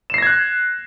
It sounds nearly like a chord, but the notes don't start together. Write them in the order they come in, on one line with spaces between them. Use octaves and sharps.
E7 C7 A#6 G#6 F#6